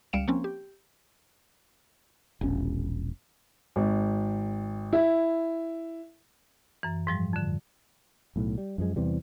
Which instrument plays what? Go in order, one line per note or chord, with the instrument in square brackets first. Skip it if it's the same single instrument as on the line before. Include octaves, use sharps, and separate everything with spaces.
[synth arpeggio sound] C#2 G3 F5 C#7 D7 E7
F3 A#3 C4 C#4
G4
[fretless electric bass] E1 A#1 C#4
[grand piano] G#1
E4
[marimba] F#2 E3
G#2 F3 G3
F2 D3
[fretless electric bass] B1 A2
G3
F#2 F3 G#3
E2 C3 E3 G3